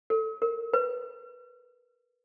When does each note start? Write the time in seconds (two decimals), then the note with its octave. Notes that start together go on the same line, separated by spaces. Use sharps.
0.10 A4
0.42 A#4
0.73 B4